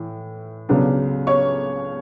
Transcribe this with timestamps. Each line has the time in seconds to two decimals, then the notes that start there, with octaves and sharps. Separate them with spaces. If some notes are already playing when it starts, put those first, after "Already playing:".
Already playing: A2 E3
0.69 C#2 C#3 F#3 B3 D4
1.27 C#5 C#6